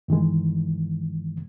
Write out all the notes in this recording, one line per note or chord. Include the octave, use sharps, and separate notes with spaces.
G2 D#3 E3 G#3